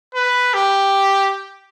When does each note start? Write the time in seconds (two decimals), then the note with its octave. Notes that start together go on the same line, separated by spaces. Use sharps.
0.15 B4
0.54 G4